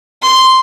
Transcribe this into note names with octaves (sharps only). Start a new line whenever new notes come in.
C6